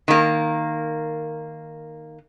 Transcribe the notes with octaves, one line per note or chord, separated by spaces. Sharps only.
D#3 A#3